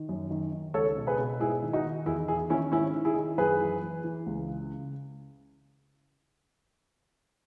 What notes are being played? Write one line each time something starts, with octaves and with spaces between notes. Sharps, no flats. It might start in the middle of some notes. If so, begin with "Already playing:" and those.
Already playing: D#3
F#2
D#3
D#3
C#2 A4 C#5
B2
G#4 B4
B2
G#2 E4 G#4
D#3
D#4 F#4
D#3
E2 E4 G#4
D#3 E4 G#4
D#3 C#4 E4
G#2 C#4 E4
D#3
E4 G#4
D#3
F#2 G#4 B4
E3
E3
E3
C#2
C#3